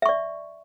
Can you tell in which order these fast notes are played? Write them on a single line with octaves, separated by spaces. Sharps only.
E5 C#6 D5